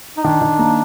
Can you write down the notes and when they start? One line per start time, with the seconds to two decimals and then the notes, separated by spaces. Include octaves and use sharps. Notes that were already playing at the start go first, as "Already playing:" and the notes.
0.17 D#4
0.24 D#3 D4
0.42 D#3
0.59 A#3